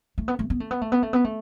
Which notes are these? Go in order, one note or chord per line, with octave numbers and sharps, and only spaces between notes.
A3
B3
A3
B3
A3
B3
A3
B3
A3
B3
A3